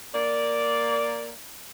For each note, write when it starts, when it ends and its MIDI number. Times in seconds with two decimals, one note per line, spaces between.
0.14 1.30 58
0.14 1.30 74